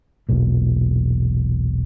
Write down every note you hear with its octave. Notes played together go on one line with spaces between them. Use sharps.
E1 B1 A#2